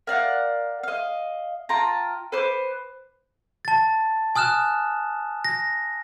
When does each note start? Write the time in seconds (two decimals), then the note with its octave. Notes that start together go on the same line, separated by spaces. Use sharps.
0.07 A#4 D5 F5 F#5
0.83 D#5 F5
1.69 F4 G5 A5 A#5
2.32 B4 C5 D6
3.65 A5 A6
4.36 G#5 D#6 F6 F#6 E7
5.45 A#6